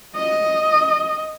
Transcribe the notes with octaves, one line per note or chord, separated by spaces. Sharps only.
D#5